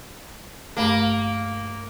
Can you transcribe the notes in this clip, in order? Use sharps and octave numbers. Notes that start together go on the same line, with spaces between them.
G2 A3 A#3